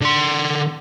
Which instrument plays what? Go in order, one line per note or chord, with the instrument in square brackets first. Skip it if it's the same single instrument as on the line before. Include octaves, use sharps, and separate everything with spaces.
[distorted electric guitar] D3 C6